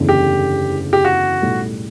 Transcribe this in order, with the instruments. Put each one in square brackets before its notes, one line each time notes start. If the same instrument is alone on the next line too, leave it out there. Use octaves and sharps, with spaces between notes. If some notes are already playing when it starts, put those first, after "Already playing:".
Already playing: [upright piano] F#1 E2 D3 A3 D4
[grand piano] G4
G4
F#4
[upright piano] B1 A2 G3